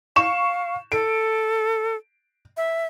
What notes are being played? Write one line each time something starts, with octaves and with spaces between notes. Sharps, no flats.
F5 C#6 E7
A4 D7
E5